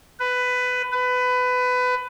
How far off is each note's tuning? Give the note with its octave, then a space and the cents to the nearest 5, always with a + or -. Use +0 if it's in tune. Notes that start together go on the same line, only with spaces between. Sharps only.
B4 +15
B4 +20